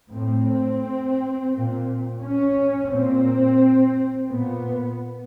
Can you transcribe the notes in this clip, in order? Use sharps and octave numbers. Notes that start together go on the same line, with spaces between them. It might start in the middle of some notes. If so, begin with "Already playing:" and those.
A2 C4
A#2
C#4
A#2 C4
A#2 B3